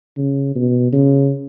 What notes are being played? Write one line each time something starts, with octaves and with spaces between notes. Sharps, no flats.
C#3
B2
C#3